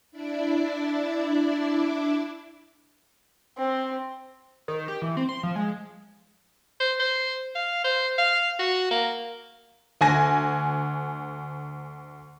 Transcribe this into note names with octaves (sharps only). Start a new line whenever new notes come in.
D4 E4 D5
C4
D#3
G4
E3
C4
C6
F3
G#3
C5
C5
F5
C5
F5
F#4
A#3
D2 G#5 A#6